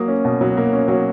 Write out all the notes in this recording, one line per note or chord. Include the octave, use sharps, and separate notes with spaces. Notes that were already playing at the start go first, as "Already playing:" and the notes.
Already playing: F#3 A#3 D#6
C#4
B2
F#3
A#3
C#4
F#3